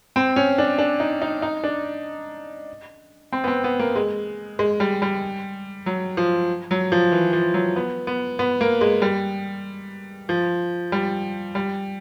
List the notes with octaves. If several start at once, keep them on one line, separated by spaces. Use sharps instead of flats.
C4
C#4
D4
D4
D#4
D#4
D#4
D4
C4
B3
C4
B3
A#3
G#3
G#3
G3
G3
F#3
F3
F#3
F3
E3
F3
F#3
B3
B3
B3
A#3
G#3
G3
F3
G3
G3